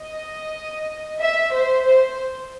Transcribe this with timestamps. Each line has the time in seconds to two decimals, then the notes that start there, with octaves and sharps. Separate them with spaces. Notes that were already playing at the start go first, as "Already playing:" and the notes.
Already playing: D#5
1.21 E5
1.54 C5
1.87 C5